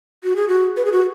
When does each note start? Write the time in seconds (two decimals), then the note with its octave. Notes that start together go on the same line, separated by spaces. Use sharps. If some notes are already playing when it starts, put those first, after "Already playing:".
0.24 F#4
0.36 G#4
0.48 F#4
0.77 B4
0.85 G#4
0.92 F#4